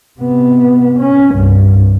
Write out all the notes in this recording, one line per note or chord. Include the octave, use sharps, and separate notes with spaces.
C3 B3
C#4
C2 G2